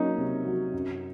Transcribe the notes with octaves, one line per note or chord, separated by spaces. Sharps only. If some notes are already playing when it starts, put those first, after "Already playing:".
Already playing: F#3 A#3 C#4 D#4
C3
F#3
F#2